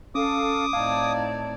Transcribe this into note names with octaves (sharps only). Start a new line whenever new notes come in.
C#4 A4 F5 D6 D#6
A2 C4 D#4 D5 F5 A5 G#6